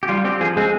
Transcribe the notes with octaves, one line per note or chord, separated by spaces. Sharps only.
G4
G3 F4
C4 G4
F3 G#4
G#3 C4 G#4